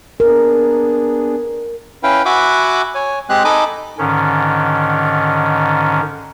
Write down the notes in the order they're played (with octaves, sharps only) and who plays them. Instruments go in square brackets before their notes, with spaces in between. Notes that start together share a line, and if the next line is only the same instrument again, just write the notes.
[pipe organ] B3 D4 G#4 [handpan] A#4
[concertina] C#4 E4 B4 F5 G5
F#4 E5 F#5 G#5 B5 D6
C#5 G#5
G#3 C4 G4 G#4 F#6
D#4 A4 D#5 G#5 B5 D6
[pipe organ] G#2 D3 D#3 C#4